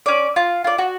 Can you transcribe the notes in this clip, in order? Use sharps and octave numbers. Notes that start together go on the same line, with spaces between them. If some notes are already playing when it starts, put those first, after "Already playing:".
C#4 D5
F4
F4 D5
F#4